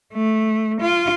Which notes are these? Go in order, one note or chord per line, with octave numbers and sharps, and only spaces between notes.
A3
F4